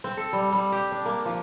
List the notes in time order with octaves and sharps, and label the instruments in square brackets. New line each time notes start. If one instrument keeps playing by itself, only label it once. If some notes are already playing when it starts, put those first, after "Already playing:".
[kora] C4
A4
G3
G3
G4
D4
A#3
F3